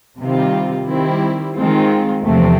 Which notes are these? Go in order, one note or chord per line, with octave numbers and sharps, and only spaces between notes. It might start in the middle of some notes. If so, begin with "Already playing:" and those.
C3 D#3 G3 C4 F4
D#3 G3 C4 E4
D#3 G#3 C4 F4
E2 C3 F3 A3 C4